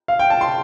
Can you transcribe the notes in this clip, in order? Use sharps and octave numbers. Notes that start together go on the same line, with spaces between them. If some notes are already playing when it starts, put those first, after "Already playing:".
F5
G5
A5
C6